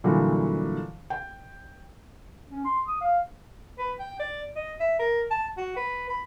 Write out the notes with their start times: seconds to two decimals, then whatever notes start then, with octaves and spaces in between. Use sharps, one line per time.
0.04 A#2 D3 E3 F#3 G3
1.10 G5
2.51 C#4
2.65 C6
2.87 D#6
3.01 F5
3.78 B4
4.00 G5
4.19 D5
4.56 D#5
4.80 E5
4.99 A#4
5.31 A5
5.57 F#4
5.76 B4
6.09 B5